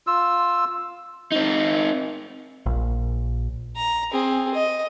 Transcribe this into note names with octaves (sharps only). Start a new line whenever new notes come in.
F4 E6
C4 D#4
A#1
A#5
C4 G#4
D#5